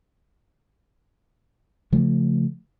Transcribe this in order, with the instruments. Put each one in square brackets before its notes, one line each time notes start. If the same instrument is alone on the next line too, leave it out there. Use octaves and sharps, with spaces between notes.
[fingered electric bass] C#3 F3 A3